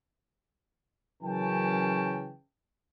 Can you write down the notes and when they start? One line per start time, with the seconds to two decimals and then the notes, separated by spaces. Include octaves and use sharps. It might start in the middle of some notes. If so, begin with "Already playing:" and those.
1.23 F#2 C#3 E3 C#4 G5 A5